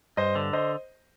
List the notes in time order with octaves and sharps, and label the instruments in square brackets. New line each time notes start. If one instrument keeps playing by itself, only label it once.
[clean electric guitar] G2 [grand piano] C5 D#5
[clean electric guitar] D3
[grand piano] C5 D#5